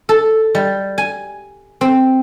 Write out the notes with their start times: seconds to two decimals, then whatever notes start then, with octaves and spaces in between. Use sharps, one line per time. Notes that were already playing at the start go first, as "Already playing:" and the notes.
0.09 A4
0.55 G3
0.98 G#5
1.81 C4